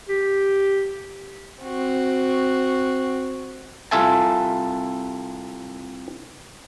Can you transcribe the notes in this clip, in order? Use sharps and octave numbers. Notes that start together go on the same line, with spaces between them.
G4
C4 F#4
C2 F4 A4 E5 G#5 A5